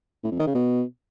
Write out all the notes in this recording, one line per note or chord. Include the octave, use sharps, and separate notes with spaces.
A2
F2
D#3
C#3
B2